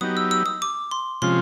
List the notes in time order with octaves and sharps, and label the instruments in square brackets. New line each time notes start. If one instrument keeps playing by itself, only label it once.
[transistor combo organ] F#3 B3 D#4 G4 [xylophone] D#6
[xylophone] E6
E6
D#6
D6
C6
[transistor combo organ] C3 F3 G#3 C#4 F4 [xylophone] C6